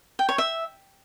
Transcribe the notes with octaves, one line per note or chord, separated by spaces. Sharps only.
G5
C#5
E5